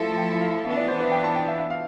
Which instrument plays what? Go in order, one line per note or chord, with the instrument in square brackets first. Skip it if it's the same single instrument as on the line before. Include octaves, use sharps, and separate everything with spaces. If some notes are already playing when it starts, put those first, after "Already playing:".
Already playing: [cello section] F3 A3 E4 A4
[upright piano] G5
F5
[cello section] E3 B3 D4 [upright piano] E5
[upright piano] D5
C5
B4
G5
A5
G5
E5
E5
F5